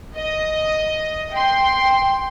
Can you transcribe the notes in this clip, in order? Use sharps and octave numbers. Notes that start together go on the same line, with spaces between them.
D#5 D#6
G5 C6